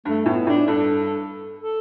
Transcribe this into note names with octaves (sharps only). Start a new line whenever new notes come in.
G2 A3
A2 B3
A2 D4
G2 A4
A4